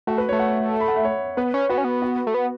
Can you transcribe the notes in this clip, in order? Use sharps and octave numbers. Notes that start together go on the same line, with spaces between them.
A3 F#4
B4
A3 C#5
F#5
B5
F#5
E5
C#5
B3 B4
C#4
B3 F#4
C#4
B3
F#4
A3
B3